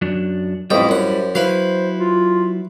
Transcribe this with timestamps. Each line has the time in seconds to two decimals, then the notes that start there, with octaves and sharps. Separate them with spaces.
0.02 F#2 F#3 D4
0.70 A1 F2 G3 E4 D#5 G5
0.89 F#2 C5 F#5
1.35 F#3 E4 B4 C5 F5
1.99 F4